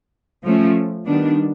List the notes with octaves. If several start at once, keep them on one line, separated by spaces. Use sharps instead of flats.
F3 A3 C#4
D#3 G3 B3 D4